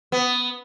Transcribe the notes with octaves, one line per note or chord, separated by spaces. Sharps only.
B3